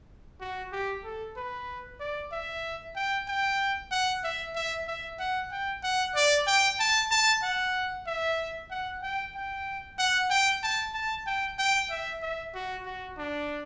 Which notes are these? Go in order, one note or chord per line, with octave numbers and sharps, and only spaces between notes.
F#4
G4
A4
B4
D5
E5
G5
G5
F#5
E5
E5
E5
F#5
G5
F#5
D5
G5
A5
A5
F#5
E5
F#5
G5
G5
F#5
G5
A5
A5
G5
G5
E5
E5
F#4
F#4
D4